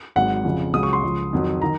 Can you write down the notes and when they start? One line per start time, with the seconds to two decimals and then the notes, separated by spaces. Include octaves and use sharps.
0.16 G#1 G#2 F#3 F#5
0.44 F2 C#3 F3
0.74 C#2 C#3 F#3 D#6
0.83 C#6
0.93 C6
1.03 C#2 C#3 F3
1.33 F2 D#3 F#3
1.62 D#3 A#5